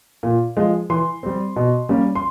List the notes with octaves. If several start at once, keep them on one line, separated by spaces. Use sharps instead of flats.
A#2
F3 G#3
E3 C6
G3 C4
B2
G3 A#3 C#4
C6